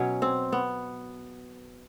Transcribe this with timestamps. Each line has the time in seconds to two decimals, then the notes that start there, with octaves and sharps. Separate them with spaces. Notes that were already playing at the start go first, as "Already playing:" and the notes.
Already playing: B2 F#3 C#4
0.22 C4
0.52 B3